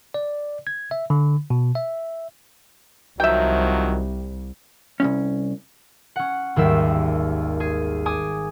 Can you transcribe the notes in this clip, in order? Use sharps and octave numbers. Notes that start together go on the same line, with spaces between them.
D5
G#6
E5
D3
B2
E5
C2 D#3 F3 F#3 E5 G5
C2 F#2 C#4
C#4 F#5
G#1 D#2 G3 E5
G#4
G#5 D6 D#6